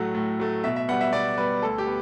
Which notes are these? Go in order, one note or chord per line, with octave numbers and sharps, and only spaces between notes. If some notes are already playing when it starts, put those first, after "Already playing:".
Already playing: A2 F#3 A3 F#5
A2
F#3 A3
B2 E5
E5
G3 B3 F#5
E5
B2 D5
G3 B3 B4
D2 A4
G4
B3